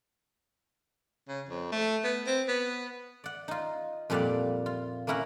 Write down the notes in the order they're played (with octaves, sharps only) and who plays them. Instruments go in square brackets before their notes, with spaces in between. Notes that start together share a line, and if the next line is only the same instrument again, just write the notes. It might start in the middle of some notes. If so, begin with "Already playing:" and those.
[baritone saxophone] C#3
F2
A3
B3
C4
B3
[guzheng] D5 F#5
D#4 F4
F2 A#2 G3 D5 F5 F#5
F4
A#3 C#4 E4 A#4 F#5